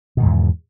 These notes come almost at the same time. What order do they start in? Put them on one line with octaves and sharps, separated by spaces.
B2 D#3 G#2 E2